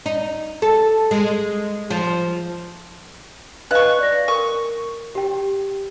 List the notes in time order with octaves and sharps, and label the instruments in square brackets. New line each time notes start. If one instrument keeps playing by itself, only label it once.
[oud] D#4
A4
G#3
F3
[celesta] B4 D#5 F5 [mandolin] C#6 F#6
[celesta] D5 A#6
[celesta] A#4 [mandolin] C#6
[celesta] G4 G5